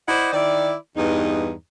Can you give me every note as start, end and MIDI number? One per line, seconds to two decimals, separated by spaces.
0.08 0.30 64
0.08 0.30 72
0.08 0.30 74
0.08 0.30 75
0.08 0.30 78
0.33 0.74 51
0.33 0.74 64
0.33 0.74 74
0.97 1.53 40
0.97 1.53 43
0.97 1.53 63